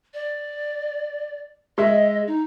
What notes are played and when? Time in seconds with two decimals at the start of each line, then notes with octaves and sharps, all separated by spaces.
0.14 D5
1.78 G#3 D#5 E5
2.27 D#4